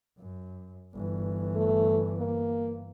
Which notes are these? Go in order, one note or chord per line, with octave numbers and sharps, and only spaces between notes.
F#2
G1 E3
A3
A#3